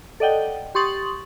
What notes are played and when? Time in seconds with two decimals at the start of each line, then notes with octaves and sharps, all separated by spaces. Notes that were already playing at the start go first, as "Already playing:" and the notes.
0.20 A4 D5 D#5 F#5 G5
0.75 G4 C6 C#6 D#6 A6 F#7